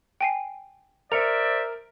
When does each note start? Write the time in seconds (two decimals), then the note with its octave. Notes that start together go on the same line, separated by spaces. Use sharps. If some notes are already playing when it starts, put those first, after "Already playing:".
0.21 G5 G#5 C7
1.12 A#4 C5 D5 E5 C#7 F7